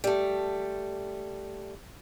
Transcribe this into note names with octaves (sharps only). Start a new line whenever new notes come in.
G3 A3